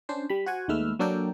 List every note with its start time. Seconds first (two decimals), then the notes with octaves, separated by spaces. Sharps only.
0.09 C#4 D4 C5
0.30 G3 B5
0.46 F#4 C5 F#5 G#5
0.68 D#2 G#3 A3 B4 E6 F6
0.99 F#3 A#3 D4 A4 A#4 G5